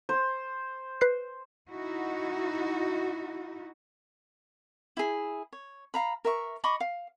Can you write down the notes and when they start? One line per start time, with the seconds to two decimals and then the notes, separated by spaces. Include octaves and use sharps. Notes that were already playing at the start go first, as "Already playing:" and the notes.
0.09 C5
1.01 B4 F#6 C7
1.69 D#4 E4 F#4
4.97 E4 G#4
5.53 C#5
5.94 F5 A#5 B5
6.25 A#4 E5 C#6
6.64 D#5 B5 C#6 D6
6.80 F5